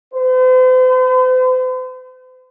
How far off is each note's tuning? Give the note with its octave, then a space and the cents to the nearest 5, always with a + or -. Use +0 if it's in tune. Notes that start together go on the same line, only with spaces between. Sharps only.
C5 -45